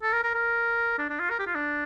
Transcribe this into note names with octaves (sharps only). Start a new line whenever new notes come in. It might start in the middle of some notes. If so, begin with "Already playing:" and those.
A4
A#4
A#4
A#4
D4
D4
F4
A#4
G4
F4
D4